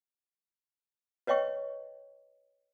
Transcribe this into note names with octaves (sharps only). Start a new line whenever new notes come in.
B4 C#5 D#5 G5 C#6